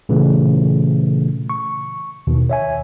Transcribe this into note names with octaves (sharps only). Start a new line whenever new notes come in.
A#2 C#3 E3 A3
C#6
D#2 B2 D#3
C#5 E5 G#5